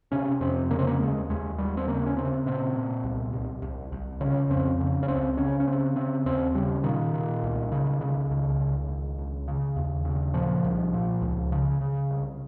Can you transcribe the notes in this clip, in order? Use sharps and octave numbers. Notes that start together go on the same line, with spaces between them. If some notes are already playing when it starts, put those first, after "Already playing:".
C3 C#4
F2 C4
C#3 A#3
C4
A#3
D#2 G#3
D#2 G#3
D#2 G3
C4
C#3 A#3
C#4
C#3 C4
A#2 C4
A#2
C2
C2
C2
C2
C#3 C#4
F2 C4
C#3
C#4
C#2 C4
C#3 C#4
C#4
C#3 C4
C#3 C4
D#2 C4
C#3 G3
A#2 D#3
A#2
C2
C#3
C#3
C#2
C#2
C#2
C#2
C#3
D#2
C#3
A#2 F3
C2
A#2
C#2
C#3
C#3
C2